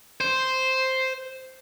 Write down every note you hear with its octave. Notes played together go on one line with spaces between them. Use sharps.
C5